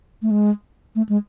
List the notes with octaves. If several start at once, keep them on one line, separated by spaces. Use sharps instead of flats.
A3
G#3
A3
G#3